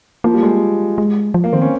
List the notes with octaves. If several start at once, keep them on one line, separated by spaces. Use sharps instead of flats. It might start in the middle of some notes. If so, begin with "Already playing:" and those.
F3 A#3
G3
G#3
G#3
F3
A#3
D#3 C4
C#4